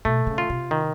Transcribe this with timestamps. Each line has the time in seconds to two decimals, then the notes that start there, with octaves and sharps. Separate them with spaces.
0.05 B2 A3
0.27 C#3
0.38 F4
0.50 C3
0.71 D#3